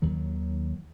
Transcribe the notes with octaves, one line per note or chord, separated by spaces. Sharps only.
D#2 D#3 F#3